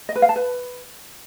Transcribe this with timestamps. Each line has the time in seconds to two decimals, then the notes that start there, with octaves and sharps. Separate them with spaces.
0.09 D#5
0.16 B4
0.22 F5
0.29 A5
0.36 B4